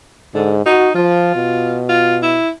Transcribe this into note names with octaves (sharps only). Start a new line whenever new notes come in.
G#2 D3
D#4 F#4
F3 F4
B2
F4
E4